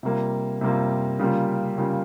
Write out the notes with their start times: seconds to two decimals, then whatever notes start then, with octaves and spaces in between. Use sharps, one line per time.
0.03 C3 G3 A#3 F4
0.61 C3 G3 A#3 F4
1.19 C#3 G3 A#3 F4
1.78 C#3 G3 A#3 F4